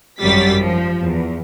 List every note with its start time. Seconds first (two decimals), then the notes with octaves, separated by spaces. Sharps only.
0.20 G#1 F#2 F#3 G3 A6 B6
0.58 F3
1.02 E2